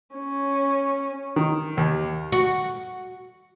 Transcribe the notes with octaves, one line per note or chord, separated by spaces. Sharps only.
C#4
D#3
D#2
F#4